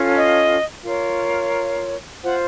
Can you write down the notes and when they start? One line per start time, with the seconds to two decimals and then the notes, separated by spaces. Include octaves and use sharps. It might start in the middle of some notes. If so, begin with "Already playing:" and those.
Already playing: C#4 F4 A4
0.15 D#5
0.84 F4 A#4 C#5 F5
2.23 F4 C5 F#5